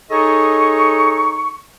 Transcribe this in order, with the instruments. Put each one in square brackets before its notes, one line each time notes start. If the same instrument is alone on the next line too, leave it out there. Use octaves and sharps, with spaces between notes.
[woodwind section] D#4 G#4 A4 C#5 D#5 C#6